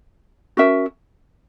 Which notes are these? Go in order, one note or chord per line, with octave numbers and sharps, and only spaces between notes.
C#4 F#4 A#4 E5